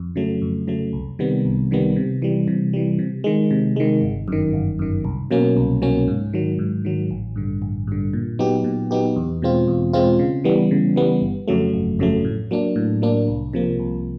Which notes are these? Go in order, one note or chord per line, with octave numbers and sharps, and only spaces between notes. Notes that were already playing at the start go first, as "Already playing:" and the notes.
Already playing: F2
C#3 F#3 A3
F2
C#3 F#3 A3
C2
C3 D#3 G3 B3
C2
C3 D#3 G3 B3
C3
E3 G3
C3
E3 G3
C3
D#3 G#3
C3
D#3 G#3
G1
F#2 D#3
G1
F#2 D#3
C2
B2 F#3 A#3 C#4
C2
B2 F#3 A#3 C#4
G#2
D#3 F#3
G#2
D#3 F#3
A1
G2 D3
A1
G2 D3
A#2
F#3 B3 D#4 G4
A#2
F#3 B3 D#4 G4
E2
B2 G#3 C4 F4
E2
B2 G#3 C4 F4
C#3
E3 G3 B3
C#3
E3 G3 B3
G1
F2 C#3 F#3 A3
G1
F2 C#3 F#3 A3
A2
F#3 A#3 D4
A2
F#3 A#3 D4
C2
C3 F3 A#3
C2